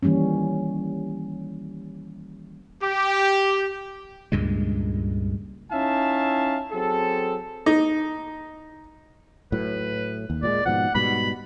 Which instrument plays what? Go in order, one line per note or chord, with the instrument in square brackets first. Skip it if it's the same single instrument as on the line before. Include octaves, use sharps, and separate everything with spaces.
[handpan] D#3 E3 G3 A#3 C#4
[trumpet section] G4
[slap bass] C#2 G2 A#2 G#3
[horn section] C#4 D#4 E4 E5 F5 A5
F#3 C4 G#4 A4
[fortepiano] D#4
[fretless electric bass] A2 F#3 [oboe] B4
[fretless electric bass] D#2
[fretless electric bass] A#2 F#3 G#3 [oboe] D5
[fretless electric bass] G#2 B2 F3 [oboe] F#5
[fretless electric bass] G#2 B2 G3 [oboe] B5